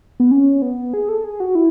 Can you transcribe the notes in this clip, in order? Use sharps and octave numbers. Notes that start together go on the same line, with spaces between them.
B3
C#4
B3
G#4
A4
G#4
F#4
E4